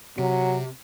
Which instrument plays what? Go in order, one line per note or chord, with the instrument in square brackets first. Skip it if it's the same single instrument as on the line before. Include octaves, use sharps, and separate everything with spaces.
[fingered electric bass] C3 [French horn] F#3